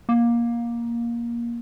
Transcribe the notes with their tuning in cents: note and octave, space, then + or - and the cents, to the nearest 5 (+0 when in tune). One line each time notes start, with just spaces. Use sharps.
A#3 +15